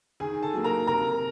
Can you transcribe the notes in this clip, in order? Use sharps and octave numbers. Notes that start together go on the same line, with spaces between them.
D#3 G#4 G#5
A4 A5
F#3 A#3
A#4 A#5
C3 A#4 A#5